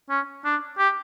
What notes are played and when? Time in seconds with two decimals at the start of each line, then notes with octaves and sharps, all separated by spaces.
0.09 C#4
0.45 D4
0.78 G4